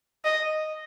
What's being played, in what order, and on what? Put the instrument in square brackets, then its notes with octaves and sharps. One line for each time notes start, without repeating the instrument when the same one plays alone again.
[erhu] D#5